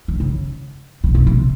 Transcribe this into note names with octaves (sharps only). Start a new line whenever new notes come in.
D3
C#3
C3
B2
C3